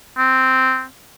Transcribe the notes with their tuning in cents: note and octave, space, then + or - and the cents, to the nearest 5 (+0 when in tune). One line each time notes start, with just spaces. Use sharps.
C4 -5